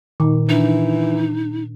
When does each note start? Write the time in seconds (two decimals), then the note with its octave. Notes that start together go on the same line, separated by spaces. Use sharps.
0.20 A#2 D#3
0.49 E3 D4 D#4